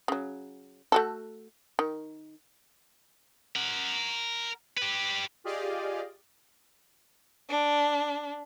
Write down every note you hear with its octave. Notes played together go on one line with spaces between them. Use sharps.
C#3 F#3
A3 F#4 A4
D#3
A#4 F#5
G4 B4
F4 G4 G#4 D5 D#5 F5
D4